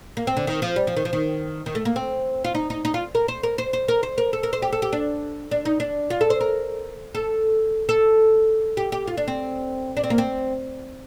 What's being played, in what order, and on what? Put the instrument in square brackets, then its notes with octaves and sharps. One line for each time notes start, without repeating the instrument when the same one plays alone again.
[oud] A#3
C4
D3
D#3
F3
G3
F3
D#3
F3
D#3
D#3
A3
A#3
C4
F4
D#4
D#4
D#4
F4
A#4
C5
A#4
C5
C5
A#4
C5
A#4
A4
A#4
C5
G4
A4
G4
D4
D4
D#4
D4
F4
A4
C5
A#4
A4
A4
G4
G4
F4
D4
C4
D4
C4
A#3
C4